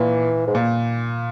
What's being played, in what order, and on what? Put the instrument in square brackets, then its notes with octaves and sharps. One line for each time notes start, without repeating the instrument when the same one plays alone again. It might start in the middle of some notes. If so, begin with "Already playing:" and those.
Already playing: [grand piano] A#2 [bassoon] E3
[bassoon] G#2
[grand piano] A#2